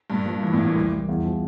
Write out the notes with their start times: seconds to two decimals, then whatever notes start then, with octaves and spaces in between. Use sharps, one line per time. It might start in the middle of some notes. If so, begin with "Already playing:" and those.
0.10 G2 A#2
0.26 F3
0.43 G2 E3
0.53 A2
0.59 E3
0.65 A#2
0.76 C2
0.93 G3
1.09 E2
1.24 F3